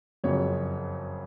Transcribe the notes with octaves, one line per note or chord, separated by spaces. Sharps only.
F#1 F2 C#3 F#3 C#5